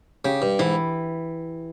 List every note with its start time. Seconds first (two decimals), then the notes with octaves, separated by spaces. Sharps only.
0.25 C#3 G4
0.42 G2
0.59 G#2 E3